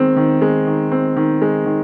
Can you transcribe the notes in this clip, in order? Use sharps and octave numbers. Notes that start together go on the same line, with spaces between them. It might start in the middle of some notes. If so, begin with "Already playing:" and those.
Already playing: D#3 G#3 C4
D#3
G#3
D#3
C4
D#3
G#3
D#3